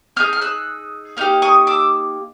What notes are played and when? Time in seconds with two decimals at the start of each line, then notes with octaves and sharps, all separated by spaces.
0.16 B3 D#4 G#4 F6 G6
0.33 F6
0.41 E6 F#6
1.17 A#3 D#4 G4 F6
1.42 C#6 D#6
1.67 D6 E6